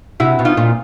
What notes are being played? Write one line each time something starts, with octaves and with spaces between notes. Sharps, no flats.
C3 E4 F#4
B2
D#4 F4
A#2